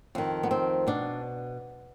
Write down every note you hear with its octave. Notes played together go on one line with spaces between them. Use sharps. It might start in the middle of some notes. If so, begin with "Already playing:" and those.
F2 D#3
B3
C4
B2 D4